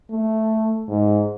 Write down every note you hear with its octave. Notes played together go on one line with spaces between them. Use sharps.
A3
G#2